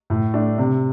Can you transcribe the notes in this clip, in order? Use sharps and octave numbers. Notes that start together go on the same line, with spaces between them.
A2
A3 D4
C3